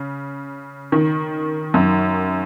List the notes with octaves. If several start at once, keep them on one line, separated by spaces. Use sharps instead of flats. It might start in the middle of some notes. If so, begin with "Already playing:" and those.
Already playing: C#3
D#3
F#2